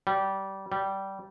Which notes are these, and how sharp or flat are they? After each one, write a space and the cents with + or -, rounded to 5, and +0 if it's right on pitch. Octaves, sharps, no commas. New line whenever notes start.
G3 -20
G3 -15